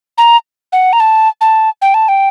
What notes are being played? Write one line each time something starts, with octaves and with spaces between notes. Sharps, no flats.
A#5
F#5
A#5
A5
A5
G5
A5
G5